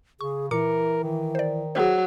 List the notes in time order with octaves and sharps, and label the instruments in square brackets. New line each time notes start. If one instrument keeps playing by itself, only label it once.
[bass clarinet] C#3 [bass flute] G#4 [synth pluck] C#6
[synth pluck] A#2 D6 C#7 [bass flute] E3 [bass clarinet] A#4
[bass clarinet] D#3
[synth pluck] C5 D5
[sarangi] F#3 [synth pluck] G#4 C5